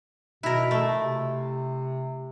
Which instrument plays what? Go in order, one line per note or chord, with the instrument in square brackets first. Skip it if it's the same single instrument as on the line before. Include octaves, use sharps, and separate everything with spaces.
[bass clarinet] B2 [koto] E4 A#4
[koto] A3
[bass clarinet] C3